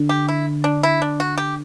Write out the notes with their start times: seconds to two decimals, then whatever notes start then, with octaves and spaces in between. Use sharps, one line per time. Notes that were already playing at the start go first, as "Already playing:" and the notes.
Already playing: D3
0.09 G4
0.28 E4
0.64 D4
0.83 E4
1.02 D4
1.20 F#4
1.38 G4